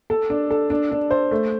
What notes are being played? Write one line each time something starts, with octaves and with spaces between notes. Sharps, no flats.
A4
D4
A4
D4
D4
C5
A3